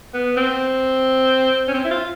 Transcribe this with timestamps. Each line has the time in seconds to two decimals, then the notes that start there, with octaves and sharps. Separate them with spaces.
0.14 B3
0.37 C4
1.68 C#4
1.74 C4
1.84 E4
1.91 F4